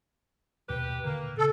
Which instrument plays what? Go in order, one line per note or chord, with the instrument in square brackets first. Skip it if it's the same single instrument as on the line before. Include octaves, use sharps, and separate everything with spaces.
[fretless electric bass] D#2 B2 [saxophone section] G4 B4
[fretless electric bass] A#2 D3 D#3 [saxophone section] A#3
[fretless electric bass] C#3 [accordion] A4